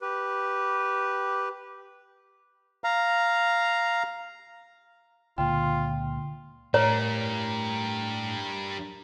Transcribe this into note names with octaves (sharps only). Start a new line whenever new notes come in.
G4 B4
F5 A#5
C#2 A#2 D3 F4 G5
A2 G3 D4 A#4 C#5